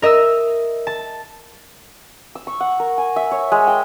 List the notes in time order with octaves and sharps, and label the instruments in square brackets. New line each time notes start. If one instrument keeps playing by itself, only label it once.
[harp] A#4 D#5 E5 E6
A5
[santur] E6
C#6
F#5
A#4
G#5
E5
C#5
G#3
G5